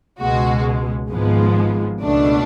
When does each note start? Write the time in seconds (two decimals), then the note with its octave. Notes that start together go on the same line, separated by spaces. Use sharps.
0.20 C#2 B2 G#3 F#4
1.11 G#1 G#2 F3 G#3 B3
2.01 C#2 B2 A3 D4